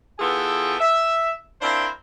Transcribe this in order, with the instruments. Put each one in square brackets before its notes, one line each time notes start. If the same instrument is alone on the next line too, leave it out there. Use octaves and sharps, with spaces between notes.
[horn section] E3 B3 F4 G#4 A4 G5
E5
C4 D4 E4 F4 A#4 C5